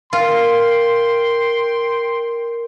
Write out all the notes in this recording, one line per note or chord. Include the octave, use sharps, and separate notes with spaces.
F4 A#4 G5 C6